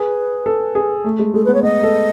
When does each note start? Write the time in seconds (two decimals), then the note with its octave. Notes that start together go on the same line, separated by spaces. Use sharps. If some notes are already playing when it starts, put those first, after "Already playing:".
Already playing: G#4 B4
0.46 A4
0.75 G#4
1.04 A3
1.19 G#3
1.34 G#3 A4
1.45 B3 B4
1.54 C#5
1.63 B3 D#5
1.83 A4